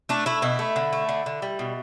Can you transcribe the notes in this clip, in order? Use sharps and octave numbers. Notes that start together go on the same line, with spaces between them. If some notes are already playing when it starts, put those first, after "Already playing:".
A3 D4
A3 E4
B2 E4
A3
D3
A3
D3
D3
G3
B2